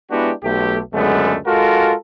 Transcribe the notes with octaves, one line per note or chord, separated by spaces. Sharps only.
G#3 B3 D4 E4 F#4 G4
B1 A3 G4
C#2 F#2 D3 G#3 A3 B3
G#3 F4 F#4 A4 A#4